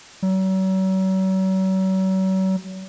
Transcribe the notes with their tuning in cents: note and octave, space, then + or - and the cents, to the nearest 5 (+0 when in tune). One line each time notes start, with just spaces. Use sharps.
F#3 +40